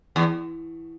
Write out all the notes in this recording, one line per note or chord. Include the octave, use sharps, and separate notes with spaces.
E2